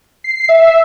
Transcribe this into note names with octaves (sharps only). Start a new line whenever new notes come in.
C7
E5